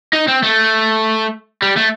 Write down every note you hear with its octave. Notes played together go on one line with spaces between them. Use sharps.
D#4
C4
A3
G3
A3